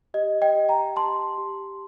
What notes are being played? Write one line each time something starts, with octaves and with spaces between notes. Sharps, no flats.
G4 D#5
D#5 G5
G4
G5 A#5
G4 A5 C6
G4